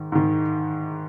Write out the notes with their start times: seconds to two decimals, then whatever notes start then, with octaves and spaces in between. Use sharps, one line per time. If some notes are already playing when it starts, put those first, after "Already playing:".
Already playing: G#2 D#3
0.12 G#2 D#3